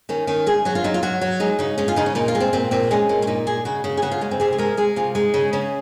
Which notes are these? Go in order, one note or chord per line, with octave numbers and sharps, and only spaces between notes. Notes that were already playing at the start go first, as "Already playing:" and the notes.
D#3 C#4
D#3 C#4
G#3 G#4
F#3 F#4
F4
F#3 D#4
F4
F#3 F#4
F#3
G#3 D#4
C#3 D#4
G#3 C#4
F4
C#3 D#4
C#4
A#2 D#4
F4
G#3
C4
A#2 C4
A#2 C4
G#3 C#4
A#2
C#4
A#2 D#4
G#3 G#4
C#3 F#4
C#3
G#4
C#3 F#4
F4
G#3 C#4
C4
C3 G#4
G#4
G#3 A#4
G#3 G#4
C3 F4
G#3 D#4
C#3
C#3 C#4